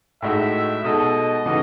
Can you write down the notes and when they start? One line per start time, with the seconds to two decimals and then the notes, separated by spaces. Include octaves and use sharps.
0.22 A2 G#3 D#4 F#4 E5
0.84 B2 G#3 D#4 A4 D#5
1.46 C#3 E3 A3 D#4 F#4